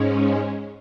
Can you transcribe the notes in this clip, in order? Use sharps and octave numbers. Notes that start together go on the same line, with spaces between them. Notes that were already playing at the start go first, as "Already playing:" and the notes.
Already playing: G#2 G#3 C#4